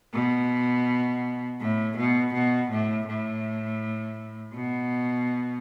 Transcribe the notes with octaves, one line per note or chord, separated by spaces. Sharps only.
B2
A2
B2
B2
A2
A2
B2